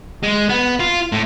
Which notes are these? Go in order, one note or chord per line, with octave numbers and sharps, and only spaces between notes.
G#3
B3
F4
A2